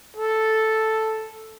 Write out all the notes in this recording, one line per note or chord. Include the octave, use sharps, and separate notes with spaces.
A4